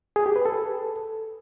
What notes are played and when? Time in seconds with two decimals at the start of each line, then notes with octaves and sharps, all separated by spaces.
0.16 G#4
0.26 G4
0.36 B4
0.46 A4